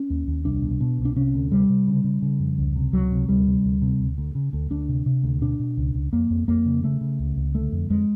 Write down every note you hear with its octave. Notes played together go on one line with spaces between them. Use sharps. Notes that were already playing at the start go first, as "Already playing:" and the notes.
Already playing: C#4
D#2
D#2
C2 D4
B2
B2
C2
D4
C3 C#4
D2
C3 G3
C3
C#3
C#3
C#3
F2
C#2
C3
C#2 F#3
C3
D2 G3
C3
D2
C3
D2
D2
C#3
D2
D2 D4
C3
C3
D2
B2 D4
B2
C#2
C#2
F2 A#3
F2
F2 A#3
C#3
C#3 A3
C#3
C#2
C#2
D3 A3
F2
F2 G#3